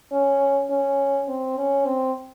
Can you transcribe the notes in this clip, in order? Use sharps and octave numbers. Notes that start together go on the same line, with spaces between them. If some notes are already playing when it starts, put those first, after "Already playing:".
C#4
C#4
C4
C#4
C4